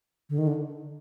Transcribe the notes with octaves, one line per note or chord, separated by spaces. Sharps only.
D3
D#3
D3